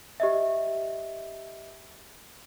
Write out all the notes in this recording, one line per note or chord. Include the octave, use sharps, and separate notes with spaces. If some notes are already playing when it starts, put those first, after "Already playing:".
G4 D#5 E5